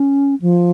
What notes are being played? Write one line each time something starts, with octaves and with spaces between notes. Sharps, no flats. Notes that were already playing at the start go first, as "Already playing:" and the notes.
Already playing: C#4
F3